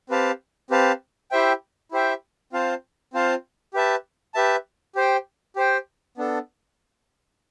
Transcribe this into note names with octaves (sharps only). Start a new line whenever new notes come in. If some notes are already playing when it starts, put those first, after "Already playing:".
C4 G4 B4 F5 A5
C4 G4 B4 F5 A5
E4 G4 C5 E5 G5
E4 G4 C5 E5 G5
C4 F4 C5 F5 A5
C4 F4 C5 F5 A5
G4 B4 E5 A5
G4 B4 E5 A5
G4 C5 G5
G4 C5 G5
B3 D4 A4